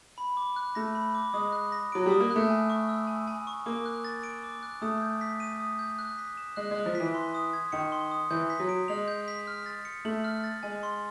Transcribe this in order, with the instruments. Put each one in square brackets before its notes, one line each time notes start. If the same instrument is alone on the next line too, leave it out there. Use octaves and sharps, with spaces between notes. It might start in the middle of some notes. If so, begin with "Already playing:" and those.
[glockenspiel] B5
D6
F#6
[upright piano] A3 [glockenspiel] A#6
[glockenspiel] B5
D6
[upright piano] G#3 [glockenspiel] D#6
[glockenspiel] F#6
A#6
[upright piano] F#3 [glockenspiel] D7
[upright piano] G3 [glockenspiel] D#6
[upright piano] A#3
[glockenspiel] F#6
[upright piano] A3
[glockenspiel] G#5
C#6
E6
G#5
G#5
C#6
[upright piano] A#3 [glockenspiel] D6
[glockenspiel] F#6
A6
D7
D6
F#6
[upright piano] A3 [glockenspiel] D#6
[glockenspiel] G6
B6
D#7
D#6
G6
F#6
B6
E7
[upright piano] G#3 [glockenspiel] F#6
[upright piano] G#3 [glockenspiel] F#6
[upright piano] F3
[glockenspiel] B6
[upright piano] E3
[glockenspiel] C6
D#6
G#6
[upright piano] D#3 [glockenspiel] C#7
[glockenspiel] C6
D#6
[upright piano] E3 [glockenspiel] G6
[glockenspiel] B6
[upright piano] F#3
[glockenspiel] D7
[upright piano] G#3 [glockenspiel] F7
[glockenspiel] G6
B6
F6
A6
C#7
[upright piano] A3 [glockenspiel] F#7
[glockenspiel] F6
A6
[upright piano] G#3 [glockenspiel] G#5
[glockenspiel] C6